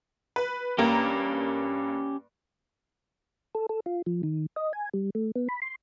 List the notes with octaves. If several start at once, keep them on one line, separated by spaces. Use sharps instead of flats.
B4
G2 A#3 C#4 G4 A#5
A4
A4
F4
F3
D#3
D#5
G#5
G3
A3
B3
B5
C6